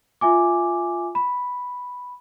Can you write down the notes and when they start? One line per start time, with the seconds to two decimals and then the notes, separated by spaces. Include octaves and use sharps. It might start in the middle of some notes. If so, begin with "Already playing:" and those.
0.21 F4 E5 G#5 D6
1.15 B5